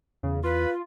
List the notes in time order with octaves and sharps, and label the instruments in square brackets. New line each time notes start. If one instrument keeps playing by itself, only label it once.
[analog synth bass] E2 [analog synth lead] C#3
[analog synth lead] F4 [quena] B4